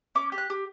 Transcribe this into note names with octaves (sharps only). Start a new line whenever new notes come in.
C#4 D6
G4
F#6
G4